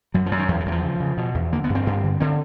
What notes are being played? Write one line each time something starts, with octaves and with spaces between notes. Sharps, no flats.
F#2 F#3
F3
F#2
D#3
E2 F3
E3
E2 F#3
F3
C#3
C#3
B2
E2
D3 A#3
B3
G2
C4
G2
D3
D3 C4